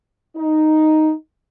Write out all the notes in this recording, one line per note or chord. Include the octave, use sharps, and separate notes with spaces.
D#4